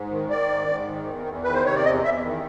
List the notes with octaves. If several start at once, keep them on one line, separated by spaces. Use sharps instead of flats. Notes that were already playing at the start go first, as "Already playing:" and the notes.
Already playing: G#2
D#3
D#3 D5
G#2
G#2
D#3
E2
E2
D#3 B4
C5
C3 C#5
D5
E2 D#5
E2 E5
D#3